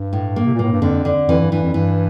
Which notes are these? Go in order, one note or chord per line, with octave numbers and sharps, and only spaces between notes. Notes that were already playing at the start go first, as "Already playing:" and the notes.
Already playing: G2
A2
A#3
C3
A#2
A2 A#3
G2
F2 D3
D3
F2 E3
G2
G2 E3
F2
G2 E3